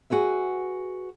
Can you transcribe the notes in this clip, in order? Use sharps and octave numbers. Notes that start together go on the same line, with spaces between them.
F#4 G#4 B4 E5